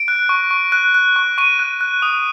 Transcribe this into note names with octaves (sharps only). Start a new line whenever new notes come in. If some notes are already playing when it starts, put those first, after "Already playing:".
Already playing: D7
F#6
C#6
C#6
F#6
F#6
C#6
C#6 D#7
F#6
F#6
D#6